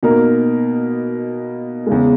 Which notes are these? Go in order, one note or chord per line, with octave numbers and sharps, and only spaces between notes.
B2 A#3 D#4 A#4
E2 C#3 G#3